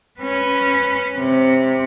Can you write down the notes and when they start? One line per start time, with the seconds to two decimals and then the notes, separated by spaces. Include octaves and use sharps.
0.21 C#4 B4
1.19 C3